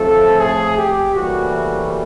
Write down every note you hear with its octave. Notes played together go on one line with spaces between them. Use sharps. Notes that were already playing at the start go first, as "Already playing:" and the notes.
Already playing: A2 F3 A3 C4 A4
G#4
G4
A2 E3 G3 A#3 F#4